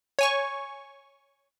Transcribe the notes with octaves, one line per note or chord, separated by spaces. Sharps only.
C#5 G#5 C#6